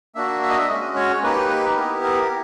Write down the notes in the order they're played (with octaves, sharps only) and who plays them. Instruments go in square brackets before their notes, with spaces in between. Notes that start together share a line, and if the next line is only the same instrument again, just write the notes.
[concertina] A#3 D4 F#4 E5
E5
D#5
E5
G#3 C#4 F#4 D#5
C#5
A#3 D#4 G4 B4
B4
B3 E4 G4 A#4
A#4